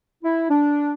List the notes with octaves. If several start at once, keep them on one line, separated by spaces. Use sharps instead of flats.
E4
D4